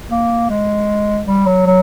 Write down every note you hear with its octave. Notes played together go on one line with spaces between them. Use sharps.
A#3
G#3
G3
F#3
F#3